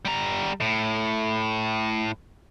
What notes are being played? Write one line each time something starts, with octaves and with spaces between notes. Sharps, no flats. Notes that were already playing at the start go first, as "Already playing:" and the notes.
G3 A#5
A2